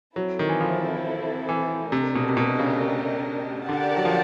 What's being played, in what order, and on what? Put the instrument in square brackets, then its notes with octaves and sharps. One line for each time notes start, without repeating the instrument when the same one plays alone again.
[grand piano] F#3 [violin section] C4 E4 A4
[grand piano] D#3
E3
F3
E3
[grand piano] C3 [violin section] A3 D4 G4 A#4 D#5
[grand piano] B2
C3
B2
C#3
[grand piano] D3 [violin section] G4 A#4 D5 F#5 A5
[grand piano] F#3
F3